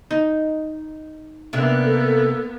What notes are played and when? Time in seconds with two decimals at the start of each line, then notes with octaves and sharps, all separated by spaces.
0.11 D#4
1.53 C3 A#3 B3 D4 E5
1.84 A4